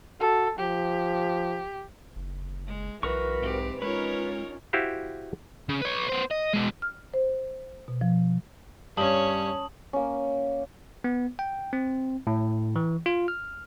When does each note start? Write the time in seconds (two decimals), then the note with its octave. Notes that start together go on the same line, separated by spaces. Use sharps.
0.21 F#4 A4
0.59 F3 G4
2.16 F#1
2.67 G#3
3.03 B1 E3 F#4 A#4 B4 C#6
3.40 G#2 C4 G4
3.82 G#3 C#4 D#4 F4 A#4 B4 C#5
4.73 E4 F#4 G4 C5 F5
5.69 C#3
5.81 B4 C#5
6.09 B3 C5
6.31 D#5
6.53 B2 G#3
6.82 F6
7.14 C5
7.88 B2
8.01 F3
8.97 G2 C#4 C#5 A5 D#6 F#7
9.93 A#3 C#4
11.04 B3
11.39 G5
11.73 C4
12.27 A2
12.76 E3
13.06 F4
13.28 F6